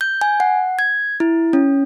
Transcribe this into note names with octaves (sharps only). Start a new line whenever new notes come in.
G6
G#5
F#5
G#6
E4
C#4